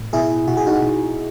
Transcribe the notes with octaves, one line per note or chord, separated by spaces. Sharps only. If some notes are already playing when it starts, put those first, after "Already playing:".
Already playing: A2
B2 E4 G#4
B2 F#4
G#4
D#4 F#4
B2